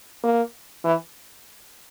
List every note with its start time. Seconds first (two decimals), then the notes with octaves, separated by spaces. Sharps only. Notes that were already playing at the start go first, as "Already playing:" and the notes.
0.24 A#3
0.84 E3